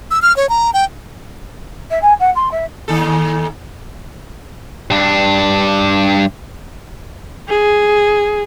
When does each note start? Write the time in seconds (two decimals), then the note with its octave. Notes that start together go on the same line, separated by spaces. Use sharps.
0.11 E6
0.22 F6
0.36 C#5
0.49 A#5
0.73 G5
1.90 E5
2.02 G#5
2.19 F#5
2.35 C6
2.51 E5
2.88 D#2 A4
4.90 G2 D4
7.49 G#4